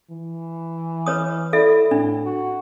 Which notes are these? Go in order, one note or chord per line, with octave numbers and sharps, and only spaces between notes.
E3
B4 C#5 D#6
E4 A4 D5 E5
A2 D4
F#4